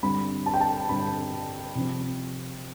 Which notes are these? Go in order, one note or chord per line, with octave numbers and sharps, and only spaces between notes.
G2 D3 G3 C4 B5
A5
G5
A5
G2 D3 G3 C4 B5
C3 F3 C4